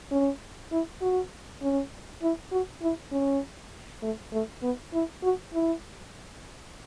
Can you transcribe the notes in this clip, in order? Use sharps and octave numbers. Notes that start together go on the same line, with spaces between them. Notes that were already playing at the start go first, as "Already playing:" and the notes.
C#4
E4
F#4
C#4
E4
F#4
E4
C#4
A3
A3
B3
E4
F#4
E4